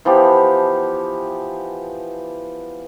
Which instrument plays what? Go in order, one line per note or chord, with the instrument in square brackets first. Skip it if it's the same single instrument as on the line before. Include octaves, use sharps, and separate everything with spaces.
[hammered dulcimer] E3 F3 B3 G4